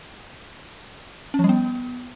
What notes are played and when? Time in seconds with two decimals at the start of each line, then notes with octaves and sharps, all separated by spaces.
1.34 C#4
1.39 F3
1.44 G3
1.49 B3